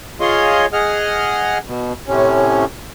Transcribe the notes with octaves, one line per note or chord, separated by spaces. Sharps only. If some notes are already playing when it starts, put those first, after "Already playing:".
F4 G#4 C#5 D#5 C6
G#4 D#5 F#5 F6
B2
A2 C3 C#4